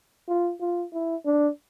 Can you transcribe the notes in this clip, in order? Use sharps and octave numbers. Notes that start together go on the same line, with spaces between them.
F4
F4
E4
D4